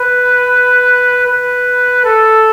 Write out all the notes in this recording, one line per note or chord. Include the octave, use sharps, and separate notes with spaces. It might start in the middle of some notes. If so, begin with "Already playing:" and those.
Already playing: B4
B4
A4